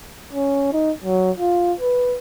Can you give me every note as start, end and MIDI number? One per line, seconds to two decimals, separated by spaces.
0.33 0.68 61
0.72 0.92 63
1.04 1.31 54
1.38 1.73 65
1.79 2.17 71